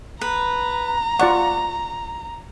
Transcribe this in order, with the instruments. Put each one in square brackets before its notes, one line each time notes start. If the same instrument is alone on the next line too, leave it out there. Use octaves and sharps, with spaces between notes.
[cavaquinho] B4 [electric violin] A#5
[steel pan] F4 D5 F#5 [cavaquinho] C#6